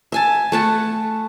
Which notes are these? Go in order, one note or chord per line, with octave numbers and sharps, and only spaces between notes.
E5 G#5 A5
A3 F#5 A5